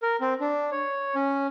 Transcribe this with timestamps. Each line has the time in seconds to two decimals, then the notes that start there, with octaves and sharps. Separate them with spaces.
0.02 A#4
0.21 C4
0.40 D4
0.72 C#5
1.15 C#4